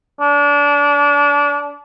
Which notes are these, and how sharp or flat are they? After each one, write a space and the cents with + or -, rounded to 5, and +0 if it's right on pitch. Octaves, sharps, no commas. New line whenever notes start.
D4 -30